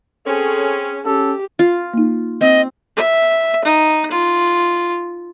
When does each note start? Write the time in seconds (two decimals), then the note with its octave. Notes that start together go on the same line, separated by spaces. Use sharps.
0.26 C4 C#4 G#4 A4
1.05 C#4 G4 A4
1.59 F4
1.94 A#3 D#4
2.41 C4 D#5
2.96 E5
3.65 D#4
4.11 F4